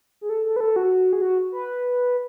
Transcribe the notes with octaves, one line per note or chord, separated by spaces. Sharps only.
G#4
A4
A4
B4
A4
F#4
G#4
F#4
B4